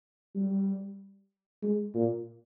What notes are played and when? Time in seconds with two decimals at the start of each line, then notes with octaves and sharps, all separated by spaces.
0.35 G3
1.62 G#3
1.94 A#2